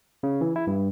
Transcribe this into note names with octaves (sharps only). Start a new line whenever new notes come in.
C#3
E3
E4
G2